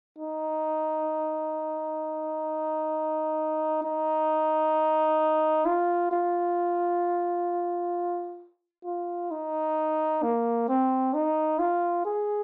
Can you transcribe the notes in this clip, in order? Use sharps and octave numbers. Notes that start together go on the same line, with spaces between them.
D#4
D#4
F4
F4
F4
D#4
A#3
C4
D#4
F4
G#4